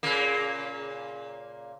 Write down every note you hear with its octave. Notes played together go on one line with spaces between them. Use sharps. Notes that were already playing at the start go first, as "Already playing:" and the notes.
A#2 C#3 A#3